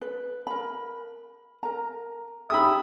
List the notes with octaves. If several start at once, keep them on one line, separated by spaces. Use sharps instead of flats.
B4
A#4 B5
A#4 A#5
D#4 G4 G#4 E5 B5 D#6